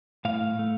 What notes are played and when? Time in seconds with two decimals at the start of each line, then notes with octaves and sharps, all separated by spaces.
0.25 A2 F5
0.59 A3